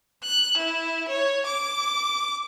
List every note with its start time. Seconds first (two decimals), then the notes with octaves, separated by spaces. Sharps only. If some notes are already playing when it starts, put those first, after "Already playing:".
0.24 F#6
0.57 E4
1.08 C#5
1.46 D6